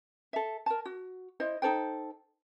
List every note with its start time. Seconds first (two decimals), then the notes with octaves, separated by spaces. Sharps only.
0.33 A4 E5
0.66 A#4 A5
0.85 F#4
1.40 E4 C5 D#5
1.62 D#4 A4 C5 G5